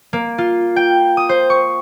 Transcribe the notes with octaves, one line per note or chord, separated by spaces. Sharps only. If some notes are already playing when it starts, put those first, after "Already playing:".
A#3
F4
G5
D#6
C5
C#6